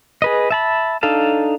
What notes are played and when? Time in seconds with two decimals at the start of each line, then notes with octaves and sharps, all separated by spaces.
0.22 G#4 B4 D#5
0.51 E5 A5 B5
1.03 D4 D#4 A4 F5 A5